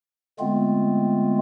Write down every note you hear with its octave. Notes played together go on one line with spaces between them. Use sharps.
D3 G#3 A3 B3 C4 F4